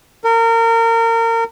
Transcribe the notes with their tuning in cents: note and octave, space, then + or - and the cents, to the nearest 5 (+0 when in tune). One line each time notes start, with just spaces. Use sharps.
A#4 -30